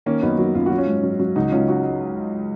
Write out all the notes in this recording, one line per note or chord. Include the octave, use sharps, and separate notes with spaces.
D#3 A#3 C#4
F#2 B3 D#4
F#3
F#2 F4
F#4
F#3
C#4 F4
G#2
F#3
F#3
C#2 D#4 F#4
C#2 C#4 F4
D#4 F#4